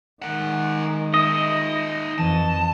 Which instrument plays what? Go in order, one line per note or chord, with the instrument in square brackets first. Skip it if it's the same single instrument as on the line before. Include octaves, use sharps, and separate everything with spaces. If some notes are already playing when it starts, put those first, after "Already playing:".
[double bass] D#3 G#3 [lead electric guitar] A#4 F#5
[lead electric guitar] D#4 E5 [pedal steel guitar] D#5
[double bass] F2 [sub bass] E3 [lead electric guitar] A5